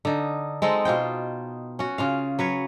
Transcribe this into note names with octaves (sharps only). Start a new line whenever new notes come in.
D3 D#4
G#3 C4 D#4 A4
B2 F4 C5 G5
C#4 F#4
C#3 F4 F5
F#3 B4 C#5